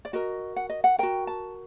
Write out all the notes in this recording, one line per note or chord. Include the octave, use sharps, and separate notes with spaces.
D5
F#4 A#4 D#5
F#5
D#5
F#5
F#4 A#4 G5
A5